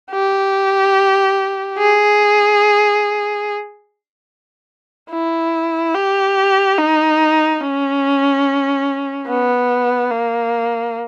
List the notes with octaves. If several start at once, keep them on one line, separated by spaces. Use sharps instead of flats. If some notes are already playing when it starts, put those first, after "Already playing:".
G4
G#4
E4
G4
D#4
C#4
B3
A#3